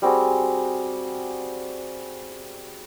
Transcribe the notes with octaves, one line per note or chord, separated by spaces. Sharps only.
G3 C4 F#4 G#4